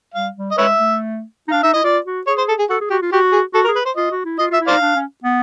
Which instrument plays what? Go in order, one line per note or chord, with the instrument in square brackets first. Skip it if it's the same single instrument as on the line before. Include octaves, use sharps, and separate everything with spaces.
[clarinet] G3 [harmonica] F5
[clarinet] G3
[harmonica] D#5
[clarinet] G#3 [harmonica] B4 C#5 E5
[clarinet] A3
D#4
[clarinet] D4 [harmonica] F5
[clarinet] D#4 [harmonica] E5
[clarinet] E4 [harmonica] D#5
[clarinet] F4 [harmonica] D5
[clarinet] F#4
[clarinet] G#4 [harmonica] C#5
[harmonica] C5
A4
G#4
[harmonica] F#4 [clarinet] A4
[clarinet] G#4
[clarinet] F#4 [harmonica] G4
[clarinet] F4
[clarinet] F#4 [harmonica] G4
[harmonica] G#4
[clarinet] F#4 [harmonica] A4
[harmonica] A#4
[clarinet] G#4
[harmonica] B4
C5
[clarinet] F4 [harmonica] D#5
[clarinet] F#4
E4
[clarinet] F4 [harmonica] D#5
[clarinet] F4
[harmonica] E5
[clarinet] E4
[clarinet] D#4 [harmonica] C5 D5 F5
[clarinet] D4
C#4
B3